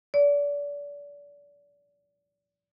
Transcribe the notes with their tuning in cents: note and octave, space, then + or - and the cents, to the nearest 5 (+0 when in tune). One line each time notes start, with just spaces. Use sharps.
D5 -30